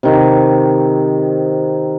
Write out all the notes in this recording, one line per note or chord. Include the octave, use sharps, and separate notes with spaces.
C3 D#3